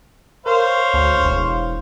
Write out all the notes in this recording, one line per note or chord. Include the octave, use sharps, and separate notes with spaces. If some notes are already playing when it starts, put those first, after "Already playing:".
A#4 C5 C#5 F5
D2
E1